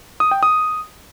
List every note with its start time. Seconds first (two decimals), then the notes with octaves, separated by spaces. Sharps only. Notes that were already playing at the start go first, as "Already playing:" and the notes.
0.20 D#6
0.31 G5
0.43 D#6